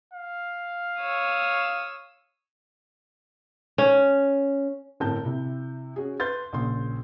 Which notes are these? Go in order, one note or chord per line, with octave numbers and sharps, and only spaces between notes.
F5
C#5 D#6 E6
C#4
G1 A2 C4 A#4 A5 G6
C3 E4
C#4 F#4 G#4
B4 C6 G6 A6
A#1 A#2 C#3 C6